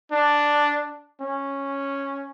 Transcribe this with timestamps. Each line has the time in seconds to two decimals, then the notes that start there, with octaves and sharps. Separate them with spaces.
0.12 D4
1.21 C#4